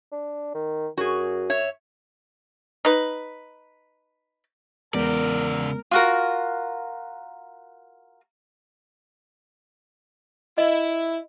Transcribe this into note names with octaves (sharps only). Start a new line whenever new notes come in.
D4
D#3
F#2 F#4 G#4
C#5 E5
D#4 B4
E2 C#3 G#3 B3 A#4 D5
F4 F#4 A#4
E4 D#5